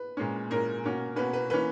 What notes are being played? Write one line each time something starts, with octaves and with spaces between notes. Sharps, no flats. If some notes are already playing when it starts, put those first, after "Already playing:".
Already playing: B4
A#2 G#3 C#4
A#2 G#3 C#4 A#4
B2 A#3 C#4
B2 A#3 C#4 B4
B4
E3 A#3 C#4 B4